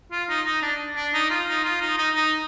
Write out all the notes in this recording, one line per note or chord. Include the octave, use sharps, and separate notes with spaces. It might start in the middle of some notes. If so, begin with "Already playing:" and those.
F4
D#4
D#4
D4
D4
D#4
F4
D#4
F4
D#4
D#4
D#4